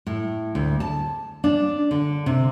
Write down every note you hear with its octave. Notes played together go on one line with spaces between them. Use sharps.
A2
D2
A5
D4
D3
C3